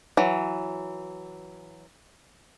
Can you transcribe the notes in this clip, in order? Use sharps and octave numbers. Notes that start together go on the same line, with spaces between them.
E3 F#3